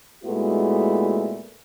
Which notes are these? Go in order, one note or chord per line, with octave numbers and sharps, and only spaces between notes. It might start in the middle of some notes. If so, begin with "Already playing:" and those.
A#2 G#3 A3 B3 E4 F#4